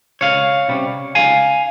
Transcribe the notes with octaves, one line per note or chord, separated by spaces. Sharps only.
C#2 C#5 F5
C3 G3 C#4
C#2 F5 G#5